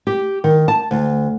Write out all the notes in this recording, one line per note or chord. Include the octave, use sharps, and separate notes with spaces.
G4
D#3
A5
D2